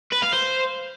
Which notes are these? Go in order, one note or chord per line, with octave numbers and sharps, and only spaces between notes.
B4
F5
C5